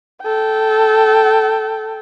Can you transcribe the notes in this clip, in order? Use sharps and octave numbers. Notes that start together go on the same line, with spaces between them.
A4 G5